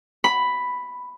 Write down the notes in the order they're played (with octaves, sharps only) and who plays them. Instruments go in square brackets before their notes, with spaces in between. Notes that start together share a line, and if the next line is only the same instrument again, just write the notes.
[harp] B5